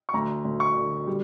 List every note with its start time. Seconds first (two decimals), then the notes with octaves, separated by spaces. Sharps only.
0.09 C#6
0.14 D2 A#5
0.45 D2
0.60 C#6
0.76 D3
1.07 G3